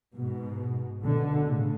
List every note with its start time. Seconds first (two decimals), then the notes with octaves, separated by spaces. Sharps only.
0.16 G#2 B2
1.03 B2 D3
1.47 A2 C#3